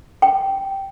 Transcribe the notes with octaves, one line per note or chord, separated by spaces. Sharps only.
G5